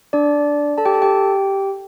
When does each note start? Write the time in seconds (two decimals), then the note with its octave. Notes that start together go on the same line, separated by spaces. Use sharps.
0.13 D4 D5
0.78 A4 A5
0.85 G4 G5
0.94 A4 A5
1.02 G4 G5